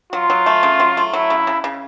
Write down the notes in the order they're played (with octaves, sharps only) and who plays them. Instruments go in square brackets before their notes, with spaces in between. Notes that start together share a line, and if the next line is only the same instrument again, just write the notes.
[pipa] F#3 [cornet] F4
[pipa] F#3
A3
C#3
F#3
A3
[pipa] F#3 [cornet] E4
[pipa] C#3
C#3
C#3